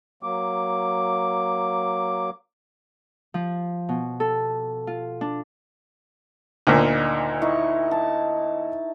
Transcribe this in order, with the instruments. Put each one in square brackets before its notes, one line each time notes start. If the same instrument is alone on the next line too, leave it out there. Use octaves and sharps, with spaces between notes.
[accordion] F#3 A#3 D6
[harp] F3
B2
A4
F4
D4
[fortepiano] D2 A#2 [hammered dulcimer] D#3
[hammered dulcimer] D#4 E4 C#6
A5